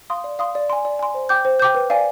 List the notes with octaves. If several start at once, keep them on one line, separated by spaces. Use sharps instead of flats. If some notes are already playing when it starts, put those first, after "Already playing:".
F5 C6 D#6
D5
F5 C6 D#6
D5
G#5 C6
D5
G#5 C6
C5
G5 D6 G6
C5
G5 D6 G6
B4
D5 F5 G#5